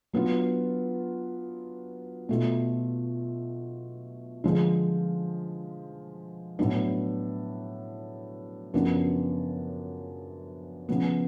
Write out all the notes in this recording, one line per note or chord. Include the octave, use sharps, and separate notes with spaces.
F#3 B3 D4 F4
B2 A3 F4
D3 F3 G#3
A2 F#3 B3 D4
F#2 C#3 F3 B3 D4
C#3 F3 B3